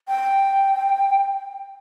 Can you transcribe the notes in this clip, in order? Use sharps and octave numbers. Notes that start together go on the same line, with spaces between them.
G5